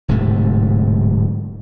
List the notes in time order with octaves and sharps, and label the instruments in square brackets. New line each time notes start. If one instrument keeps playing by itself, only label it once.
[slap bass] D1 G#2 C3 A3